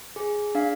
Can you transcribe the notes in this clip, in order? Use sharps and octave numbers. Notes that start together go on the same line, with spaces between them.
G#4
D4 F5